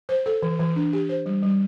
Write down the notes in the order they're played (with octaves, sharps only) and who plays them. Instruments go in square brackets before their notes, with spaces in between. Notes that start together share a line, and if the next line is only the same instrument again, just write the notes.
[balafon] C5
A4
E3
E3
D4
G4
C5
G3
G3